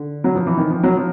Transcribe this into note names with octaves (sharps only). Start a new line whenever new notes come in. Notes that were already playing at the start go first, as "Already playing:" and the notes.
Already playing: D3
F#3
F3
E3
D#3
F3
F#3
F3